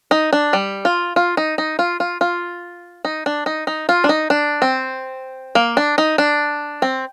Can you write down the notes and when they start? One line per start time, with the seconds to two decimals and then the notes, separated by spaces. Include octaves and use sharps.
0.11 D#4
0.33 D4
0.53 G3
0.85 F4
1.16 F4
1.37 D#4
1.58 D#4
1.79 F4
2.00 F4
2.21 F4
3.05 D#4
3.26 D4
3.46 D#4
3.67 D#4
3.89 F4
4.04 D4
4.09 D#4
4.30 D4
4.62 C4
5.55 A#3
5.77 D4
5.98 D#4
6.18 D4
6.82 C4